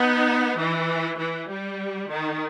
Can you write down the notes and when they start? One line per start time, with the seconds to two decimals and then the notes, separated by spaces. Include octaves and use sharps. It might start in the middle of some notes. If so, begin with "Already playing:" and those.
Already playing: B3 D#4
0.58 E3
1.18 E3
1.48 G3
2.09 D#3